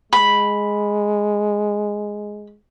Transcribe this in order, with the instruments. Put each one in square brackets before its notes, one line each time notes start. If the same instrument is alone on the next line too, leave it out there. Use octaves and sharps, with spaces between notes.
[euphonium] G#3 [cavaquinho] B5